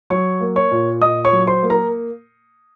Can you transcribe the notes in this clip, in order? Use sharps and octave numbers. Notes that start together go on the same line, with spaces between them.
F#3 C#5 C#6
A#3
C#5 C#6
A#2
A#2 D#5 D#6
C#5 C#6
F#3
C5 C6
A#3
A#4 A#5